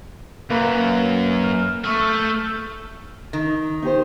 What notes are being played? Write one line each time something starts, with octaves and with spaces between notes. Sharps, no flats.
F#2 A#3 B4 A#5
F6 E7
A3 C#6 E6 F6
G6
D#3
D#4 G4 C5